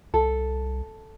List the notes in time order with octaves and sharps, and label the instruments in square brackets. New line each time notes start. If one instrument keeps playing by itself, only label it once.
[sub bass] C2 [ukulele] A4